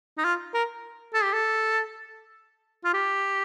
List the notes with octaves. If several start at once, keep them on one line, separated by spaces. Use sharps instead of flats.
D#4
F4
A#4
A4
G4
A4
F4
G4